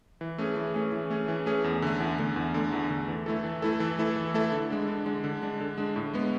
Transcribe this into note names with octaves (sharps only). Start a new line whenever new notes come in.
E3
A3 C#4 G#4
E3
A3 C#4 G#4
E3
A3 C#4 G#4
E3
A3 C#4 G#4
E2
D3 A3
E2
D3 A3
E2
D3 A3
E2
D3 A3
E3
A3 E4 A4
E3
A3 E4 A4
E3
A3 E4 A4
E3
A3 E4 A4
D3
G#3 D4
D3
G#3 D4
D3
G#3 D4
D3
G#3 D4
A2
G#3 B3